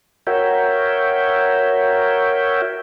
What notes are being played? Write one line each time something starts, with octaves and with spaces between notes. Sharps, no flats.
F#4 A#4 C#5 E5 G5